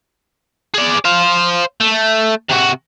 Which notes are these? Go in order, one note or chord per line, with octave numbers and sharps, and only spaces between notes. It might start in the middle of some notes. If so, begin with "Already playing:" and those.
G#4 D5
C5 F5
A3
C3 F#4